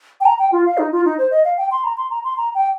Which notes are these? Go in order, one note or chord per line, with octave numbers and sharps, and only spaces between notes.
G5
A#5
G5
F4
F5
D#4
F4
D#4
C5
D#5
F5
G5
C6
A#5
C6
A#5
C6
A#5
G5